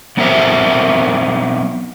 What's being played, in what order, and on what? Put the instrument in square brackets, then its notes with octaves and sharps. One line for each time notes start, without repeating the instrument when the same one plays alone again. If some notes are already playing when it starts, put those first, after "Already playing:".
[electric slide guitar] F#3 B3 C4 A#4 C5 E5